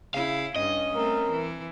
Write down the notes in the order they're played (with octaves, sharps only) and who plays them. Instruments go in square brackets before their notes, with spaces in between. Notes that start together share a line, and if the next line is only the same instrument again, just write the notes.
[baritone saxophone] C#3 [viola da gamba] E4 [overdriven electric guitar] F5
[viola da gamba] G2 [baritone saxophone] C#4 [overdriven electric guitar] D#5
[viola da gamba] A3 C4 [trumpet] A#4
[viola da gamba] E3